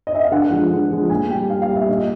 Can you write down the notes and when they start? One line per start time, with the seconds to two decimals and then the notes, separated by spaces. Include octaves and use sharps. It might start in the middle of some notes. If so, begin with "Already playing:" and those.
0.07 D#5
0.15 E5
0.23 F5
0.32 D3 F#5
0.51 F3 G#3
0.71 D3
0.91 F3 G#3
1.10 A#2 G#5
1.29 G3 G5
1.49 A#2 F5
1.62 F5
1.69 G3
1.76 E5
1.88 A#2 D#5